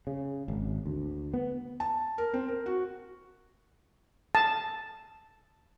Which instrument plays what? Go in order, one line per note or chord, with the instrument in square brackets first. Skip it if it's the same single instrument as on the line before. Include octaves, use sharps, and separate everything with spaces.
[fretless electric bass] C#3
G#1
D2
B3
[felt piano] A5
A#4
C4
A#4
F#4
[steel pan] A5